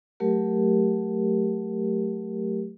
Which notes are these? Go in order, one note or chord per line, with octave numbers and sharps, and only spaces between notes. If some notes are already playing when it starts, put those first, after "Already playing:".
F#3 A3 G4 A#4